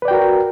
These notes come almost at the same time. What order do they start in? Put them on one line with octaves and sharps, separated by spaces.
B4 D5 G5 F#4 A#4